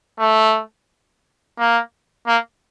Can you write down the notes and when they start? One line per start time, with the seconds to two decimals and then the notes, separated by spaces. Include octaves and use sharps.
0.19 A3
1.58 A#3
2.27 A#3